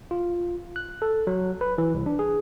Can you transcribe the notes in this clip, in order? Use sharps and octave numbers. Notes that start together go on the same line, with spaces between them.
F4
F#6
A4
F#3
B4
E3
C2
D4
G#4